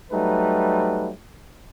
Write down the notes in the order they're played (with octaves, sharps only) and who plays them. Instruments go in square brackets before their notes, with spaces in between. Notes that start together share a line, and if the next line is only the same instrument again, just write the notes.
[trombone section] F#3 G3 A3 D#4 B4